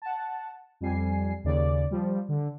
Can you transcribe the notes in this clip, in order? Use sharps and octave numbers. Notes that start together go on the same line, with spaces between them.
F#5 A5
F2 G3 G#5 C7
D#2 C#3 D5
F3 G3
D3